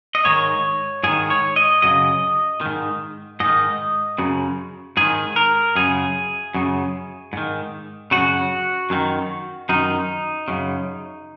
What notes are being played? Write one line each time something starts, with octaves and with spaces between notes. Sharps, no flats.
D#5
G#2 D#3 C#5
G#2 D#3 G#4
C#5
D#5
F#2 C#3 D#5
G#2 D#3
G#2 D#3 D#5
F#2 C#3
G#2 D#3 G#4
A#4
F#2 C#3 G#4
F#2 C#3
G#2 D#3
F#2 C#3 F#4
F#2 D#3
F#2 D#3 D#4
F#2 C#3